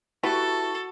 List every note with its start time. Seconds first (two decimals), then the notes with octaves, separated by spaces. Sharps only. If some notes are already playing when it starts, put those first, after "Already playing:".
0.23 E4 F#4 G4 A4 B4 C#6